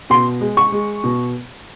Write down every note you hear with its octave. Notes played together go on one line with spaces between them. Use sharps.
B2 C6
G#3
C#6
G#3
B2